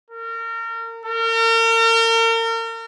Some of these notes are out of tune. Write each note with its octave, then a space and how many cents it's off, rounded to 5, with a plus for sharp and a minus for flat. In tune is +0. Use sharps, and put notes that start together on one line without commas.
A#4 -30
A#4 -40